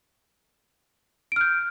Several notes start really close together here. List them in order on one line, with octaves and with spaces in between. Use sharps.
D7 F6 G6